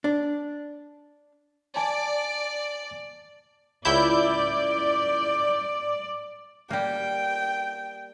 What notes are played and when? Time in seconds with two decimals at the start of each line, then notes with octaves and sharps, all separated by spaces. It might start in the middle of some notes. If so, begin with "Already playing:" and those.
0.04 D4
1.76 D5 G#5 A5
3.85 C#2 E4 D5 G6
6.70 G3 A#3 G5